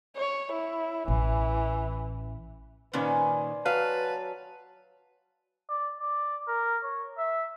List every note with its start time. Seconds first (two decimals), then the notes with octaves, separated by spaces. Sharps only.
0.17 C#5
0.53 E4
1.08 A1 E3
2.93 A#2 D#3 C#4 B4 C5 D5 G#5
3.66 F#3 B4 F5 A5
5.69 D5
6.00 D5
6.48 A#4
6.83 C#5
7.18 E5